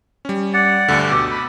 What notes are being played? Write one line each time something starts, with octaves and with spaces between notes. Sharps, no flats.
G3 C#4
D5 F#5
D2 G2 D3
B2 G4 E6
B5